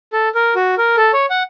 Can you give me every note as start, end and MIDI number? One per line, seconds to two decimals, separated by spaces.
0.13 0.29 69
0.35 0.54 70
0.55 0.75 66
0.78 0.96 70
0.97 1.12 69
1.13 1.26 73
1.30 1.43 78